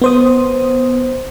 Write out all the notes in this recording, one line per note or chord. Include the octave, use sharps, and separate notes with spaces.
B3 C5 D#6